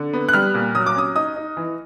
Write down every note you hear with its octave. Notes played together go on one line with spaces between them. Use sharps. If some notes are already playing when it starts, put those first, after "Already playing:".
Already playing: D3
B3
F#6
G3 F6
A#2
F#3 D#6
D6
C#4 D#6
D#4 D#6
D#4
E3